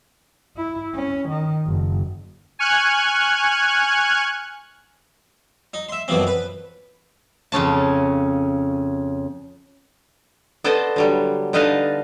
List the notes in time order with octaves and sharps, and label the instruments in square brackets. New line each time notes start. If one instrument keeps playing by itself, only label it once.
[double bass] E4
C#4
D#3
F#1
[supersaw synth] G#5 C#6 F6 F#6 G#6
[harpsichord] D#4
E5 C6
F#2 B2 E3 F3 C4
B4
[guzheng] F2 C#3 C#4 A5
[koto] B3 A4 C5 D5 D#5 A5
D3 F#3 G3
D3 D#4 B4 D#5 F5 A5